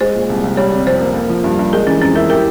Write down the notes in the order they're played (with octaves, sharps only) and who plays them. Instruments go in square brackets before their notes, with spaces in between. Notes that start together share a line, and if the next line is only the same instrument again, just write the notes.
[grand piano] G#3 [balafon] C5
[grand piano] A#2
C2
C2
[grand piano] G3 [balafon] C#5
[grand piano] C3
[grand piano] F2 [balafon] C5
[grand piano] A#3
A#3
F3
G2
G2
[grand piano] G#3 [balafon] A#4
[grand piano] E3 [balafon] C#4
[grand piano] F2 [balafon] C#4
[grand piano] E4 [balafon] A#4
[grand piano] G4 [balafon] A#4